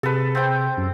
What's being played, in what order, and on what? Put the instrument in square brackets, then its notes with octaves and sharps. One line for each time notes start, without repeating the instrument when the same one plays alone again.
[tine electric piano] C3 G#4 [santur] A4 B4
[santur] C4 G5
[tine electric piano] F#2